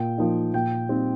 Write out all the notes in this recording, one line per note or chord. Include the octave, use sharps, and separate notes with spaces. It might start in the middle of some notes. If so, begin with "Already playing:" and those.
Already playing: A#2 G5
F3 A#3 D#4
A#2 G5
G3 C4 D#4